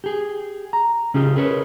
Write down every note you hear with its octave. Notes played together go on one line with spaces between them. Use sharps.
G4 G#4
A#5
C#3 C#4 F4 G4 G#4
G#4 A#4 B4 C#5